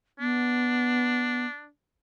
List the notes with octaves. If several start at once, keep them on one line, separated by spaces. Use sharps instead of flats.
B3 D4